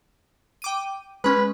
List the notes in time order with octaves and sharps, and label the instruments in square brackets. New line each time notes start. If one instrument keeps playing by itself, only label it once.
[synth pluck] G5 D6 D#7
[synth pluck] G#3 C#4 [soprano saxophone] B4